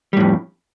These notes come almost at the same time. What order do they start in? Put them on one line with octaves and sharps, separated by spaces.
G3 A2 F2